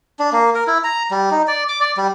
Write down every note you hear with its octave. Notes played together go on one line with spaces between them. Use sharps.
D4
A#3
A#4
E4
A#5
G3
D#4
D5
D6
D5
G3